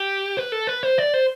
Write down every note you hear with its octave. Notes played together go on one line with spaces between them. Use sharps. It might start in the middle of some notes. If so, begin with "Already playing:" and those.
Already playing: G4
B4
A4
B4
C5
D5
C5